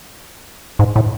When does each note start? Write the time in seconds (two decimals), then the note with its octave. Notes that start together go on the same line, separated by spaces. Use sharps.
0.79 G#2
0.96 A2